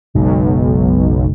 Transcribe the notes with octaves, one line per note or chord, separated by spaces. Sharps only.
F#1 B1 G#3